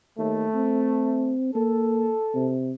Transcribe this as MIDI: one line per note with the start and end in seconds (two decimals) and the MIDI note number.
0.18 0.45 39
0.18 1.34 57
0.54 1.55 60
1.55 2.14 58
1.55 2.51 69
2.35 2.73 48